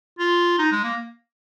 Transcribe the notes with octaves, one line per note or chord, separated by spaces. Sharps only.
F4
D#4
G#3
A#3